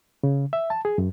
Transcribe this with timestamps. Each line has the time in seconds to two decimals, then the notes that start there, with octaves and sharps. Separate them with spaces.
0.23 C#3
0.53 E5
0.70 A5
0.85 G#4
0.98 F#2